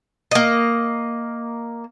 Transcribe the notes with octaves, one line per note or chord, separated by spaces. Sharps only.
A#3 D#5